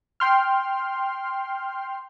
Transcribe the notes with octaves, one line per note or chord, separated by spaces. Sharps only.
G5 C6 F6